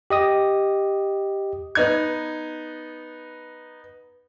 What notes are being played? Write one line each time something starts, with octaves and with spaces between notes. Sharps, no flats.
G4 D#5 D#6
B3 D#4 G#6